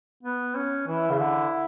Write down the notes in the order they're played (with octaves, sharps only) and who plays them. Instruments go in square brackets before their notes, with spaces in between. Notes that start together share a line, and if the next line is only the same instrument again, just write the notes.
[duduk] B3
C#4
[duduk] E3 [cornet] E4
[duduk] C#3
D3